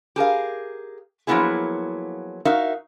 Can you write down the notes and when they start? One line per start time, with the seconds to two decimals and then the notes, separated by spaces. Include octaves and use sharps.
0.16 G4 G#4 A#4 F5
1.27 F3 F#3 A#3 B3 E4 G#4
2.45 D#4 F#4 A#4 E5 F5